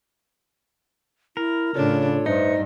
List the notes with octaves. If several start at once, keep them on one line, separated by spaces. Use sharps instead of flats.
E4 A#4
A2 C#3 D4 F4 A4 C#5
G2 D#4 B4 C5 E5 C#7